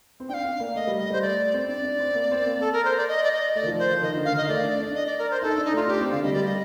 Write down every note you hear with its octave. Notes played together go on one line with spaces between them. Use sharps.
C4
D4 F5 G5
D4
A#3
A3 D#5
G3
D#5
G3 C5
A3 D5
C4
D4 D5
D4
C4
A#3
C4
A#3
A4
A#4
C5
D5
D#5
D5
D#5
A3 D5
D#3
F3
C5
F3
D#3 D#5
D3
F5
D#3 D#5
A3 D5
D4
D4
D#5
D5
A#4
C5
D#4 A4
D4
D#4
A3 F4
D4 G4
C4
D3 F5
G3 D#5
G3 D5
D#5